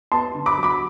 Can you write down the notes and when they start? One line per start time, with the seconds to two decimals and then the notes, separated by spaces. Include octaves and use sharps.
0.12 B3 A5 C6
0.35 D3
0.46 B5 D6
0.57 F#3
0.63 B5 D6